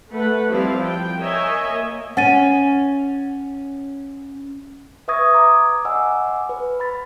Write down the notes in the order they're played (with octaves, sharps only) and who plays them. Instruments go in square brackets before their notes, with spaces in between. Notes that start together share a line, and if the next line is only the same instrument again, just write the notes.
[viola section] A3 B4 F#5
F3 G3 C4 E4 F5
G5
A#4 C#5 D#5 E5 G#5
A#3
[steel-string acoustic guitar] C#4 [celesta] F#5 A6 D#7
[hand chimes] B4 E5 C#6 D#6 G#6 A#6
A#5 D6
D#5 F#5 G#5 D6 E6
B4
B5 A6